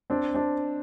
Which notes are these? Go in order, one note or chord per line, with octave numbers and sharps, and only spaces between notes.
C4 D4
C4 D4